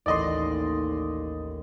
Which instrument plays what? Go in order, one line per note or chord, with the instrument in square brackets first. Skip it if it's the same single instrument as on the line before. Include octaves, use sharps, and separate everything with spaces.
[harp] A1 D#2 [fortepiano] D5 D#5 C6